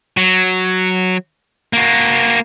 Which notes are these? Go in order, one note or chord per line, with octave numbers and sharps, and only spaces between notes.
F#3
A#3 F#4